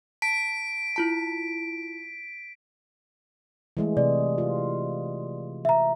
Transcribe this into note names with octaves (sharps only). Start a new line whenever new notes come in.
A5 B6 D7
E4 F4 A5
E3 G#3 A3
C3 D5
F4
E5 A#5